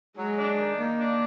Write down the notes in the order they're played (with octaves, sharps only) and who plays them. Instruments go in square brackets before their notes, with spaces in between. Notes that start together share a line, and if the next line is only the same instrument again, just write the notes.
[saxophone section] F#3 [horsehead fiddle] G#3
[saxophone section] D4
D#3
[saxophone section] D#3 [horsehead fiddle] A#3
[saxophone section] D4